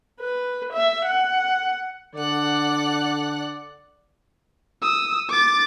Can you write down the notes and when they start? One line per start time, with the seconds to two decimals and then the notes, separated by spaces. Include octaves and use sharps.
0.21 B4
0.73 E5
1.06 F#5
2.15 D3 D5 F#5 F#6
4.82 D#6 E6
5.29 D6 A6